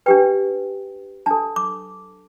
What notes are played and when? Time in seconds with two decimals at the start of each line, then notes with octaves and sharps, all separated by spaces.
0.06 D4 G4 B4 G5
1.26 D4 A4 A5
1.56 D6